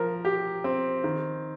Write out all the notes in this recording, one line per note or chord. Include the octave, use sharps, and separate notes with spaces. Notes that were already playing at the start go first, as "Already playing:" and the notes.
Already playing: F3 A#4
G4
C4
D#3